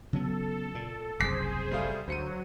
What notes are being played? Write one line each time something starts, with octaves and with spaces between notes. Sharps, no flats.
C#3 F#3 B3 A4
A#2
F#1 C2 G#4 C5 D6 B6 C7
G3 A3 F5
D2 F#3 C5 C#7 D#7